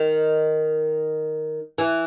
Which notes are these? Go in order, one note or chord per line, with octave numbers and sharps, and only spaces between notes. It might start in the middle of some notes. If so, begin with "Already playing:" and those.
Already playing: D#3
E3